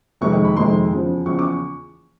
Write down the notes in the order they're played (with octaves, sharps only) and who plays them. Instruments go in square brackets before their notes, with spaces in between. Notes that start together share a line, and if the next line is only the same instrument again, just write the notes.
[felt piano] F2 C3 D#3 G#3 C#6
C#6
B5
F2 C3 D#3 G#3 C6
E2 C#3 F3
E2 C#3 F3 C#6
D6
C#6